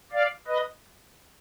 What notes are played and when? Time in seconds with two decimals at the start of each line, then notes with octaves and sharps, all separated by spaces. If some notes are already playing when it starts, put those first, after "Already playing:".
0.12 D5 F5
0.48 B4 D#5